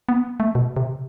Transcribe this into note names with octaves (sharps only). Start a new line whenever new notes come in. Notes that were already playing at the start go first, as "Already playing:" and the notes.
B3
A3
B2
C3